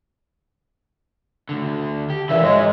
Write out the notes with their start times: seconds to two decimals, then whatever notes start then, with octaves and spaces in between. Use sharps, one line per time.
1.49 D2 D3
2.10 G4
2.29 E2 A#2 D3 E3 E5
2.43 G#2 F#3 G#3 G#4